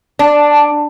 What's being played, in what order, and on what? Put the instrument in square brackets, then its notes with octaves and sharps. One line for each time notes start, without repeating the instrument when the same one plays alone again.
[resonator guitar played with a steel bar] D4 [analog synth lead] A5